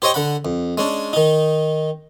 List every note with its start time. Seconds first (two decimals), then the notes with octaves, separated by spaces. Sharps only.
0.02 G4 C5 C#5 D#5 G5
0.14 D3 F#5 B5
0.45 F2
0.78 G#3 C#4 D4
1.13 D#3 D#4